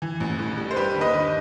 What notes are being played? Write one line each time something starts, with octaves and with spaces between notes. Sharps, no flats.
E3
A1
A2
G3
C5
G3 G4 B4
D#2
B4 D#5
D#3